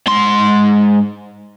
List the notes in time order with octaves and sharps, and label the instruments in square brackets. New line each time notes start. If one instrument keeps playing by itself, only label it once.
[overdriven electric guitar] G#2 C6